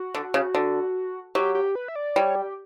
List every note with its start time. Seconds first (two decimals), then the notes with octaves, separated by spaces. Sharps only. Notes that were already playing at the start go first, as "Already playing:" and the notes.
Already playing: F#4
0.14 D3
0.34 C#3
0.55 D3
1.35 F#3 G4
1.55 G4
1.75 B4
1.88 E5
1.96 D5
2.16 G3 C#5
2.35 G4